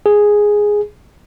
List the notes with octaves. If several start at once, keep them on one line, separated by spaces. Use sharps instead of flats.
G#4